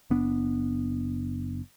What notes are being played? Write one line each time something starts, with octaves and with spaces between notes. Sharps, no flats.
F#1 B3 D4